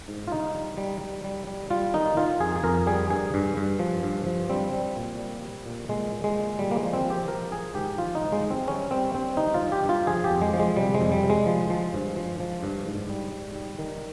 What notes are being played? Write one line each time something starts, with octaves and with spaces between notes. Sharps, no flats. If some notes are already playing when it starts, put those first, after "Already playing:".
G#2
F4
G2 D#4
G3
G3
G3
G3
G3
G3 F4
D#3 D#4
D#3 F4
F2 G#4
G#4
F2 A#4
G3 G#4
G2 G#4
G2
G2
F3
G2
F3
G3 C4
G3
A#2
G3
G3
A#2
A#2 G#3
A#2
G#3
A#2
A#2 G3
A#3
G#3
F3
C4
F3
G4
F3 A#4
F3 G#4
G#2 G4
F3 F4
D#4
G#2
G#3
G#2
C4
G3 C#4
G3 C4
G2 C4
G3 D#4
F4
G2
G4
G2
F4
F3 G#4
G4
F2
G#3
F3
G#3
C3 G3
G#3
F2
G3
C3
G#3
F3
F3
G2
F3
F3
G2
G#2
G3
G#2
G3
D#3